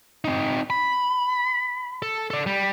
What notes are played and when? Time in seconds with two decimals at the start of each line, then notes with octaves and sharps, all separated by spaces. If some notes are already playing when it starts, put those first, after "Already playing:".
0.25 C4 D#4
0.70 B5
2.02 A4
2.30 A4 D5
2.47 G3